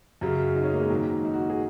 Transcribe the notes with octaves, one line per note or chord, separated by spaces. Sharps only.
F#2 C#3 F#3
D#4
C#4
A#3
G#3
G#2 D#3 F#3 A#3
D#4
F#4
G#4